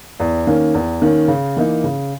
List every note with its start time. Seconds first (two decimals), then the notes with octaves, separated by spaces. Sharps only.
0.20 E2
0.47 D#3 A#3 C#4
0.74 E2
1.02 D#3 A#3 C#4
1.28 C#3
1.57 E3 A#3 D#4
1.84 C#3